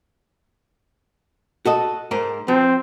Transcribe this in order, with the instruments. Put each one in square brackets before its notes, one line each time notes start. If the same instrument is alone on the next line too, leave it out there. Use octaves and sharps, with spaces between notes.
[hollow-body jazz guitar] F#4 A4 D#5
G#2 A#4 C5
[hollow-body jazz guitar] F3 [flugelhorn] C4